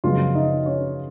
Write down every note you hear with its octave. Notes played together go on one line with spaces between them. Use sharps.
F#2 C#3 F3 G#3 B3 F4 F5
D#4 D#5
C#4 C#5